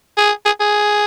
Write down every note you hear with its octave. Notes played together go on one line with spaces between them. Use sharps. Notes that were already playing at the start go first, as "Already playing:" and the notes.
G#4
G#4
G#4